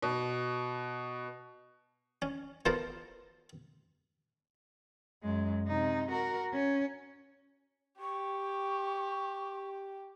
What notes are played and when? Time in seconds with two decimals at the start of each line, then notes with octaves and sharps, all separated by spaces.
0.02 B2
2.22 C#4
2.66 B3 F4 A4 A#4 C5
5.22 F#2 G#3
5.68 C3 D#4
6.11 F#4 A#4
6.53 C#4
8.00 G4 C#6